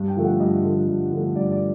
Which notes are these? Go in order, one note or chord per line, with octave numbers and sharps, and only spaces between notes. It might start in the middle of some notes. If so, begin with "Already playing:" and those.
Already playing: G2
G5
D3 F3 A3
F#5
G2 D#5
D3 F3 A3
G2
D3 F3 A3
G2 D5
D5